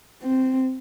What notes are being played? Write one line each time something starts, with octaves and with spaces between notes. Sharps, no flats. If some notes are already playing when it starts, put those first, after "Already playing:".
C4